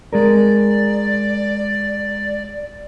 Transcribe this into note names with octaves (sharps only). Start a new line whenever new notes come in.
G#3 G#4 A#4 D5